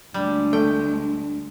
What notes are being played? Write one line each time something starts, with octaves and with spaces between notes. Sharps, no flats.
D2 G3 G#3 D4
A3 G5